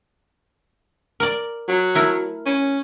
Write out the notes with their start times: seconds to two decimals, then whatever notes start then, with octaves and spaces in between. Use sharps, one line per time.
1.20 A#4 D5
1.68 F#3
1.95 A3 E4 A#4
2.46 C#4